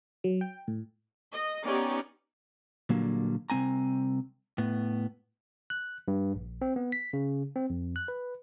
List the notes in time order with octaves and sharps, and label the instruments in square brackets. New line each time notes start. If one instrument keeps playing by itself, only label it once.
[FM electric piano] F#3
G5
A2
[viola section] D#5
B3 C#4 D#4 G4 D5
[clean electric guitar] A#2 D3 F#3 G3 A#3
C2 A3 C4 G#5 A#5
A2 B3
[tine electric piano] F#6
G2
A#1
C4
B3
B6
C#3
C4
F2
F#6
B4